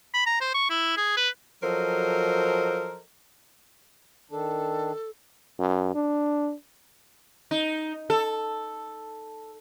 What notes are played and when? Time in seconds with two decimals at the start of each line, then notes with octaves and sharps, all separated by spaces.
0.14 B5
0.26 A#5
0.41 C5
0.54 C#6
0.70 E4
0.97 G#4
1.17 B4
1.63 F3 F#3 A4 A#4 C5 D#5
4.31 D#3 D4 A4
5.59 F#2
5.95 D4
7.51 D#4
8.10 A4